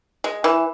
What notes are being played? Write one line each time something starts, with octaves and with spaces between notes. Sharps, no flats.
G#3
E3